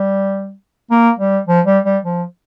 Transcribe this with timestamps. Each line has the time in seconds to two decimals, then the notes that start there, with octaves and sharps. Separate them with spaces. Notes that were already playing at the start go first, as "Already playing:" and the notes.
Already playing: G3
0.91 A#3
1.19 G3
1.47 F3
1.66 G3
1.85 G3
2.03 F3